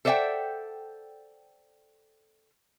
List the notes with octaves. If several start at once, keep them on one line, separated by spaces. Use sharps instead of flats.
A4 C5 D5 E5 F#5 G5